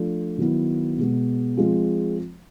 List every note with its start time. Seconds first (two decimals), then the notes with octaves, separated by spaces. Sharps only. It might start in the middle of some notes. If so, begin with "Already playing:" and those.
Already playing: F3 A3 D4 F4
0.38 D#3 F#3 B3 E4
0.98 B2 G#3 B3
1.57 F3 G#3 C4 F4